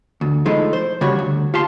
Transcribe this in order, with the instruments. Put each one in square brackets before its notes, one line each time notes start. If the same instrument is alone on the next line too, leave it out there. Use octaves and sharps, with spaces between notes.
[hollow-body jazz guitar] D2
F3 G#3 A3 D#4 E4
C5
C#3 G3 F#4 C#5
D2
F4 G4 A5 C6